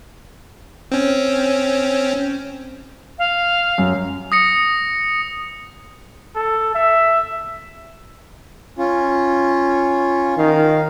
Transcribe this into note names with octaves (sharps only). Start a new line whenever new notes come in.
C4 C#4
F5
F#2
D#6 A#6 C#7
A4
E5
C#4 F4
D#3 F5